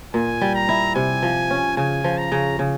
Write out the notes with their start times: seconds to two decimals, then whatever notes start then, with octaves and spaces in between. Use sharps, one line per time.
0.14 A#2 G#5
0.41 G3
0.55 A#5
0.69 E4
0.95 C3 G#5
1.23 F3
1.51 C#4
1.77 C#3 G#5
2.04 F3
2.18 A#5
2.32 C#3
2.59 C#3